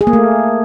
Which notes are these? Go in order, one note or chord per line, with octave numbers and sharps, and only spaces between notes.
G#4
A#3
A3